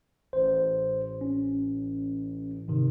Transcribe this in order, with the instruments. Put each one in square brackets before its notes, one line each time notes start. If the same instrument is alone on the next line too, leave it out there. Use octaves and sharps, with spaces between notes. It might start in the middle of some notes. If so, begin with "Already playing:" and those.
[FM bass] A1 [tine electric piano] C5
[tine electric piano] C#4
G#2 C3 D#3